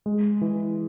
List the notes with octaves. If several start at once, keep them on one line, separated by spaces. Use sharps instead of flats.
G#3
E3